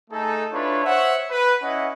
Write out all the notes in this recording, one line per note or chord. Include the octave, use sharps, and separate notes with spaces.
A3 D#4 G#4 A4
D4 E4 F4 B4 C#5
C5 C#5 E5 F#5
B4
C#4 E4 D#5 F#5